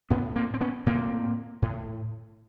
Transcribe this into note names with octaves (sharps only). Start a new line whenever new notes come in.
A2 B3 C#4
A#3 C4
C4
B3 C#4
A2 A#3 C4
A2